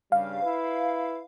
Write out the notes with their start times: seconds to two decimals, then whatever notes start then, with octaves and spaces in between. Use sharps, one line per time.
0.12 G2 C#3 G3 F5
0.42 E4 B4